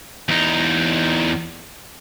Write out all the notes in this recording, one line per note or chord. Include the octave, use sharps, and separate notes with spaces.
E2 D#4